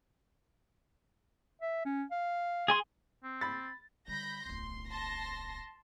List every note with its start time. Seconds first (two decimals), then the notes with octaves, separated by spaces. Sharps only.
1.62 E5
1.86 C#4
2.11 F5
2.68 G#4 G#5 C6
3.24 C4
3.41 B5 A6
4.08 D3 G3 B5 G6 A#6
4.45 D1 B1 C6
4.87 A5 C6 A#6